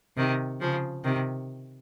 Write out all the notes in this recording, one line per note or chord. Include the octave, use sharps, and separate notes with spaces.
C3 D#3
C#3 F3
C3 D#3